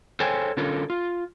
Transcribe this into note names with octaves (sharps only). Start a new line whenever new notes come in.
G#4 A4 C5 C#5 G5 G#5
D3 C#4 F4 A4 A#4
F4